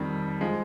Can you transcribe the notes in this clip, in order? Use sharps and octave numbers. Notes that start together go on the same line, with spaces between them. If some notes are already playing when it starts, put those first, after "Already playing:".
Already playing: F2 D#3 G3
F3 G#3